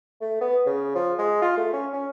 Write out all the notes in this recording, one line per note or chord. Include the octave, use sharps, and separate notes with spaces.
A3
B3
C#3
F3
G#3
F4
A3
C#4
C#4